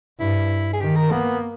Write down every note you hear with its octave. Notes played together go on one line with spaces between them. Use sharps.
G2 E4
G#4
D#3 G4
A#4
A#3 B3